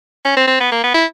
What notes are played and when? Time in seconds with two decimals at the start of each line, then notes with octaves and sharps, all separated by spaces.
0.25 C#4
0.37 C4
0.48 C4
0.60 B3
0.72 A#3
0.84 B3
0.94 E4